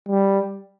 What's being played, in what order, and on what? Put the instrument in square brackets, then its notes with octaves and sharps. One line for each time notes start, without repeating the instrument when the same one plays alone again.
[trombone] G3